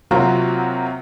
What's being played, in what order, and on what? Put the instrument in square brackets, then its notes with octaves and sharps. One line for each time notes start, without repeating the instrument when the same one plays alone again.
[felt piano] C3 F#3 A#3 C4 F4 F#4